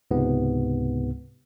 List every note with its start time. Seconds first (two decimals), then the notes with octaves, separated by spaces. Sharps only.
0.11 C#2 G#2 C3 B3